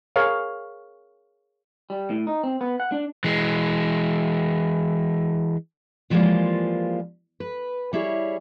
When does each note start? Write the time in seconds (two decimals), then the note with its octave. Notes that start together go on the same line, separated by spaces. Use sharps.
0.16 G#4 A#4 C#5 F5
1.90 G3
2.10 A2
2.27 D#4
2.43 C4
2.61 B3
2.80 F#5
2.92 D4
3.24 E3 G#3
6.10 E3 F3 G3 G#3 A#3 F4
7.40 B4
7.93 G3 E4 G#4 C#5